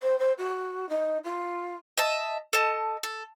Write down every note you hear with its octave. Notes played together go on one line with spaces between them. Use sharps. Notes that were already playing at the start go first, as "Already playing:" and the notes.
C5
C5
F#4
D#4
F4
D#5 E5 A5
A4 D#5 A5
A4